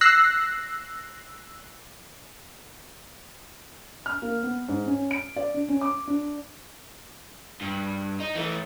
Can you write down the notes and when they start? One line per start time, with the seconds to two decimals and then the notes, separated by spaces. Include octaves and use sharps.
0.01 E6 F#6 A#6 C7
4.06 F6
4.22 A#3
4.43 B3
4.68 G#2
4.86 C#4
5.11 D7
5.36 D5
5.54 D4
5.69 C#4
5.81 D6
6.08 D4
7.61 G2
8.20 D#4
8.35 E3 A3